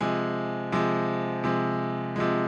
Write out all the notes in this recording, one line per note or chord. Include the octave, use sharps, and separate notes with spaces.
C3 F3 G#3 G#5
C3 F3 G#3
C3 F3 G#3
C3 F3 G#3